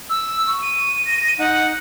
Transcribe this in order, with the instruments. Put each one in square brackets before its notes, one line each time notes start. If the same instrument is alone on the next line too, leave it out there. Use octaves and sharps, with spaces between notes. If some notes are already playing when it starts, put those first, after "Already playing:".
[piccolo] E6
[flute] C#6
[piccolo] D#7
[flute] A#6
[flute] D#4 [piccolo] F#5